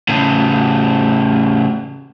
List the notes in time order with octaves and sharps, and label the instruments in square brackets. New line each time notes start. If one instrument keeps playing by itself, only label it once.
[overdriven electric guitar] A2 C#3